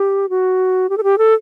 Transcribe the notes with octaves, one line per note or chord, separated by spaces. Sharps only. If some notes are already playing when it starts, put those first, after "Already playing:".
Already playing: G4
F#4
G4
A4
G4
A4